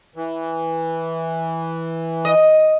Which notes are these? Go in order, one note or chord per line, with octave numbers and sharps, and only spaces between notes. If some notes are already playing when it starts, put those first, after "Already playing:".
E3
D#5